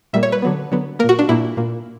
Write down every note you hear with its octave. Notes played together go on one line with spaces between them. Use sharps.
A#2 G3 A#3 E5
C#5
B4
D3 F#3 B3
D3 F#3 B3
A#2 A#3 A#4
F#4
D4
A#2 A#3 E4
A#2 A#3